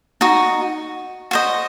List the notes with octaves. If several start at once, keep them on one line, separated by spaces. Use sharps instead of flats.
D#4 F#4
F#4 C5 D#5